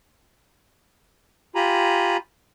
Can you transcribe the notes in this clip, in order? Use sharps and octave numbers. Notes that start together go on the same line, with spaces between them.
F4 G4 G#5 A#5 B5